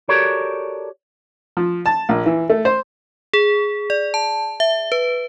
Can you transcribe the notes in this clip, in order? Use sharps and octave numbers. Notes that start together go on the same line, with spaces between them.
F#4 G4 A4 A#4 C#5 D5
F3
A5
A#1
E3
A3
C5
G#4
D5
A5
E5
B4